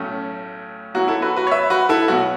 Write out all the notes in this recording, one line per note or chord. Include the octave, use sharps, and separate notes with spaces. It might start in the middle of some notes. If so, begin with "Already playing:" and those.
Already playing: B1 A2 A3 C#4
F#2 F#3 B3 E4 F#4
E4 A4
F#4 B4
F#4 B4
C#5
B4 E5
F#4 B4
E4 A4
B1 B2 B3 F#4